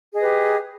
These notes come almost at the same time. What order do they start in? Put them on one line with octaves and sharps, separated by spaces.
G#4 D#5 B4 G4